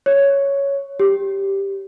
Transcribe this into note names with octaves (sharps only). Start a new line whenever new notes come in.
C#5
G4